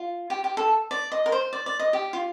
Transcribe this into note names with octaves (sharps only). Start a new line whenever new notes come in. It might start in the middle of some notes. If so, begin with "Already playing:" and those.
Already playing: F4
G4
G4
A4
D5
D#5
A#4
C5
D5
D5
D#5
G4
F4